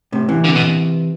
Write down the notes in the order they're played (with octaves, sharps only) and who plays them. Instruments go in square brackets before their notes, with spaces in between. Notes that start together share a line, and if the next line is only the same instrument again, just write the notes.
[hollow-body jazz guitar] A2 C3
C3 E3
[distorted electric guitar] D3
B2